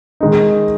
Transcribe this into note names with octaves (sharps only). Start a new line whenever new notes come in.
D#3 G#3 D#4